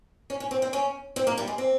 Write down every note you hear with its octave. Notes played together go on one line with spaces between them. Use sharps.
C#4
C#4
C4
C4
C#4
C4
A#3
G3
G#3
C4